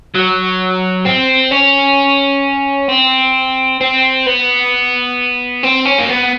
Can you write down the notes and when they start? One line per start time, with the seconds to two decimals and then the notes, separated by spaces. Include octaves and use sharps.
0.15 F#3
1.06 C4
1.51 C#4
2.89 C4
3.81 C4
4.26 B3
5.63 C4
5.86 C#4
5.99 A#3
6.09 B3